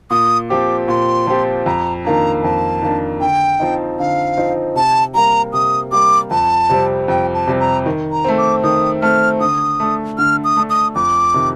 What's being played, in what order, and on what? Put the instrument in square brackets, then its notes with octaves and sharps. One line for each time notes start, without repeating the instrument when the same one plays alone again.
[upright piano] A#2 [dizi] D#6
[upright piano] F3 C4 G4 [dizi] D6
[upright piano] A#2 [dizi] C6
[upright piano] F3 C4 G4
[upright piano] F2 [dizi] A#5
[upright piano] D#3 A#3 D4 [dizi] A#5
[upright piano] F2 [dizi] A5
[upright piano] D#3 A#3 D4
[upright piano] D3 [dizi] G5
[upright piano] F3 C4 D#4
[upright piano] D3 [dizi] F5
[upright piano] F3 C4 D#4
[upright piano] C3 [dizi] A5
[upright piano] G3 A#3 [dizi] A#5
[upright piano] C3 [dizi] D#6
[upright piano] G3 A#3 [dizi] D6
[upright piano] F2 [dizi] A5
[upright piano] C3 G3 C4
[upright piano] F2 [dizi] G5
[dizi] A5
[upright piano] C3 G3 C4
[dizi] A#5
[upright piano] D#3
[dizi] A#5
[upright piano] A3 C4
[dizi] D6
[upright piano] D#3 [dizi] D#6
[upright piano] A3 C4 [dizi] F6
[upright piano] D3 [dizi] D#6
[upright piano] A3 D4
[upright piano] D3 [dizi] F6
[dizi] D#6
[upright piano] A3 D4
[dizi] D#6
[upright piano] F2 [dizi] D6
[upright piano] C3 D#3